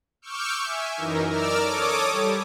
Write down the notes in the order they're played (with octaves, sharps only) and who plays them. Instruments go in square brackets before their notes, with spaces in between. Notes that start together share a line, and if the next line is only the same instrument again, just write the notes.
[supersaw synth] C#6 D6 E6 F6 G6
E5 G#5
F#2 E3 D#4 A#4
A#4 D5 D6 E6 F6
A4 C#5 D6 D#6
G3